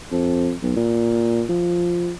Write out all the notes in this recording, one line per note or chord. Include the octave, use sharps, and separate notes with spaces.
F2
B1
A#2
F3